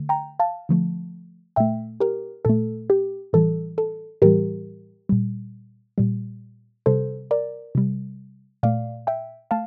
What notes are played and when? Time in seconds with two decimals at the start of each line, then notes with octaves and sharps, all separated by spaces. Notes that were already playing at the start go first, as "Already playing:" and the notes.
Already playing: D3 A3
0.09 G5 A#5
0.40 F5 A5
0.69 D3 F3 A3
1.56 A#2 A3 E5 G5
2.00 G4 A#4
2.45 A#2 A3 A4
2.90 G4
3.33 A2 E3 G3 A4
3.78 A4
4.22 A2 E3 G3 G4 A#4
5.09 A#2 G3
5.98 A#2 G3
6.86 C3 G3 A4 C5
7.31 A#4 D5
7.75 C3 G3
8.63 A#2 A3 D5 F5
9.07 E5 G5
9.51 A3 F5 A5